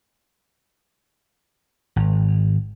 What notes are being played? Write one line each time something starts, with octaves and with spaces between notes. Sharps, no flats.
G#1